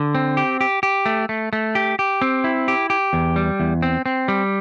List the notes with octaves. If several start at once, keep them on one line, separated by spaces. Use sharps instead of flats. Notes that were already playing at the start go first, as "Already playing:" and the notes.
Already playing: D3
C4
G4
G4
G4
A3
A3
A3
G4
G4
C4
E4
G4
G4
E2
G3
E2
C4
C4
G3